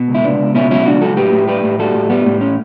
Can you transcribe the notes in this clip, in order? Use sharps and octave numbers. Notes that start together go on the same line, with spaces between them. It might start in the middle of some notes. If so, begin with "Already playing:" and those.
Already playing: B2
C#2
E4
C#2 B3 D4
C#2
B2 C#4 E4
F#3 C#4 E4
C#2 D4 F#4
F#3 F#4 A4
A2 G4 B4
A2
G3 G4 B4
A2
G3 F#4 A4
A2
G3 B3
A2
C#4